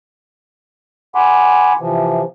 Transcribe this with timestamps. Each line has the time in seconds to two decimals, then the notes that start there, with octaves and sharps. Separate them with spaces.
1.15 F#5 G#5 B5 C6 D6
1.80 C3 E3 F3